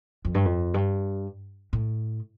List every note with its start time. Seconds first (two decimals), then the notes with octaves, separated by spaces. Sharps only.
0.25 F2
0.35 G2
0.45 F2
0.74 G2
1.73 A2